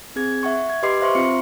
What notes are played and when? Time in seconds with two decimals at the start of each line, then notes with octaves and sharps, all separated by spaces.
0.16 C4 G#4 G#6
0.43 E5 F#5 C#6
0.70 G#6
0.83 G4 B4 D#5 C6 D6 C7
1.01 C5 E5 F5 C6 C#6
1.15 C4 F4 F5 C#7